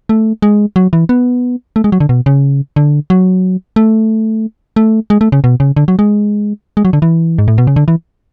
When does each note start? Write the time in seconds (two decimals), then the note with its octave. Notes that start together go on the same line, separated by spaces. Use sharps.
0.09 A3
0.42 G#3
0.76 F#3
0.93 E3
1.09 B3
1.76 A3
1.84 G#3
1.92 F#3
2.00 D3
2.09 B2
2.26 C#3
2.76 D3
3.10 F#3
3.76 A3
4.76 A3
5.10 G#3
5.21 A3
5.32 C#3
5.44 B2
5.60 C#3
5.76 D3
5.88 F#3
5.99 G#3
6.77 G#3
6.85 F#3
6.93 D3
7.02 E3
7.38 G#2
7.48 A2
7.58 B2
7.67 C#3
7.76 D3
7.88 E3